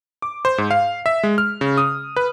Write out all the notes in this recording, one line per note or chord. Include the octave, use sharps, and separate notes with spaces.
D6
C5
G#2
F5
E5
G#3
F6
C#3
D#6
B4